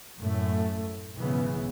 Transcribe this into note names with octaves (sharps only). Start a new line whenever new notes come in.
F#2 A2 A3
B1 G#2 C#3 E3 B3